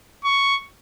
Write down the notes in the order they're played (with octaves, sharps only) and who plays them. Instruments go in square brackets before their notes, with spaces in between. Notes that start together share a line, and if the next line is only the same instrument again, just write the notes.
[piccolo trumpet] C#6